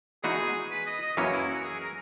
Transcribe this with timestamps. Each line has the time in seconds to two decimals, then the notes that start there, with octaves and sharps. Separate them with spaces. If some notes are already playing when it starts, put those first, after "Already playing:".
0.23 E3 G#3 B3 D#4 F#4 G#4
0.71 B4
0.86 D#5
1.02 D#5
1.17 F#2 E3 A#3 C#4 C#5
1.33 E4
1.48 F#4
1.64 G#4
1.80 A#4